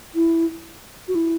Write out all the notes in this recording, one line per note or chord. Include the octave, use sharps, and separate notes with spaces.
E4
F#4
E4